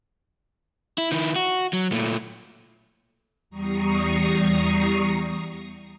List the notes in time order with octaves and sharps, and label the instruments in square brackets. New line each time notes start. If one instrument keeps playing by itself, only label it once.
[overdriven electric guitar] E4
D#3 E4
F#4
F#3
A#2 A3
[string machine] E2 G3 A#5 C#6 D#6 C7